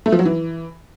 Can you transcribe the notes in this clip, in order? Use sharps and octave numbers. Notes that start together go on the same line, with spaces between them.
A3
F3
F#3
E3